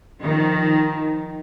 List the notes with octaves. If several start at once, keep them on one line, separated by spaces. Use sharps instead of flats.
D#3 F3